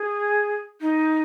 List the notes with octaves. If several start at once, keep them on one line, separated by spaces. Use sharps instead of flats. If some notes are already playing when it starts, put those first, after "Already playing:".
Already playing: G#4
D#4